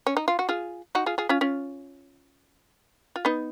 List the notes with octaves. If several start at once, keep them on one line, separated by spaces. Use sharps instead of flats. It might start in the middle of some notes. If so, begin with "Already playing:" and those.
C#4
D#4
F4
F#4
F4 G#4
D#4 F#4
F4 G#4
F4 G#4
C#4 F4
C#4 F4
F4
B3 D#4